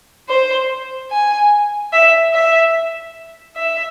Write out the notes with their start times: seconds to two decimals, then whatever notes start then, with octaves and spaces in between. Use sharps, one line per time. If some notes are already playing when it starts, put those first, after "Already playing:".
0.29 C5
1.11 G#5
1.93 E5
2.33 E5
3.56 E5